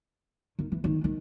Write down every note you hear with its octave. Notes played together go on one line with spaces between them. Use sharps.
D#3
E3
D#3
D#3